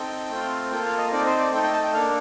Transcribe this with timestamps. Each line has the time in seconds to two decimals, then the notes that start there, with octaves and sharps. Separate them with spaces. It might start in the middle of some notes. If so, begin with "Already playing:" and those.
Already playing: C4 D#4 A4 G5
0.30 A3 C4 F4
0.71 A#3 F4 A4 G5
0.85 F5
0.98 D#5
1.12 C4 D#4 A4 D5
1.25 C5
1.39 D5
1.53 A3 D#4 A4 G5
1.63 G5
1.73 A5
1.84 G5
1.93 A#3 D4 A4 F5